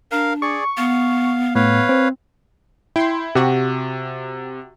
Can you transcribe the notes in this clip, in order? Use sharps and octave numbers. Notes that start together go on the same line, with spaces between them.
D4 A#4 F5
G#4 D5 C#6
B3 F5
A2 B4 C#5 F5
C4
E4 G5 C6
C3 F#4 G4